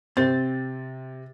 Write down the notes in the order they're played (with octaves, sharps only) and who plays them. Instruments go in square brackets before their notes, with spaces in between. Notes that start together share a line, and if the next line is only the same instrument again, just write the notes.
[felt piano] C3 A6 [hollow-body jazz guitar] C4